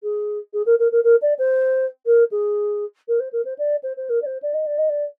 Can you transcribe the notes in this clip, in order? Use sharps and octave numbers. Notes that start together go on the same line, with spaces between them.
G#4
G#4
A#4
A#4
A#4
A#4
D5
C5
A#4
G#4
A#4
C5
A#4
C5
D5
C5
C5
A#4
D5
C5
D5
D#5
D5
D#5
D5